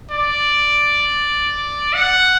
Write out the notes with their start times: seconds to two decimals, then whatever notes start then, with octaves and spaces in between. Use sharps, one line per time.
0.11 D5
1.93 F#5